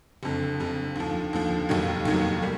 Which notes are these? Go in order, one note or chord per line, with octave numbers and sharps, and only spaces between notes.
F#1 F2 D3
F#1 F2 D3
D#2 D3 F3
D#2 D3 F3
F1 D#2 D#3 F#3
F1 D#2 D#3 F#3
G3 A#3